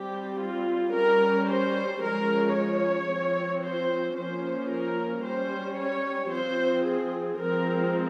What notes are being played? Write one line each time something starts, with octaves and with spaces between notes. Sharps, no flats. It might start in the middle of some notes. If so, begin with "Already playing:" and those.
Already playing: G3 C4 G4
F4
G3 C#4 A#4
C5
F3 G#3 C#4 A#4
C#5
F3 C4
C5
F3 A#3 C#4 C5
A#4
G3 C#4 C5
C#5
F3 C4 C5
G#4
F3 G#3 C4 A#4